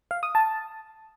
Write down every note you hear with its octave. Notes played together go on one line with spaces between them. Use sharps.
F5
D#6
A5